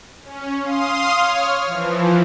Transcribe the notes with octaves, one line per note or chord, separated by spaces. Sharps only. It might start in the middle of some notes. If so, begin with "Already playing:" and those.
C#4
F5 C6 D#6
C#5 F6
E3 F3